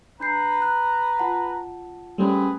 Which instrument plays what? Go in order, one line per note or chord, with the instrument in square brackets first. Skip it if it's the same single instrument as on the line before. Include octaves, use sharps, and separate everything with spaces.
[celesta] D4 G6 C7 [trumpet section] B4 A#5
[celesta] F#6
F4 F#5 A5
[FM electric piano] G3 A3 C#4 [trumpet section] C4 G#4 B4